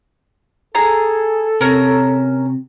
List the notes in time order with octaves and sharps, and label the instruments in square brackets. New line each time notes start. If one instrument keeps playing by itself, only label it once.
[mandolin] G#4 A#5 [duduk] A4
[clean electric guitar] C3 [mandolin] C#4 A#4